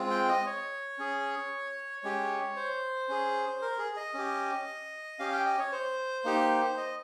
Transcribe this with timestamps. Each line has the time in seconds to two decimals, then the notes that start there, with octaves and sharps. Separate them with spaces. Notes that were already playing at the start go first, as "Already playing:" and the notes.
Already playing: G#3 C4 F4
0.11 G5
0.28 D#5
0.46 C#5
0.99 C#4 G#4
2.04 G#3 C#4 G4
2.56 C5
3.09 C#4 G#4
3.62 A#4
3.78 G#4
3.97 D#5
4.14 C#4 G4
5.19 C#4 G4 F5
5.32 G5
5.46 D#5
5.59 C#5
5.72 C5
6.25 A#3 D#4 G4
6.77 D#5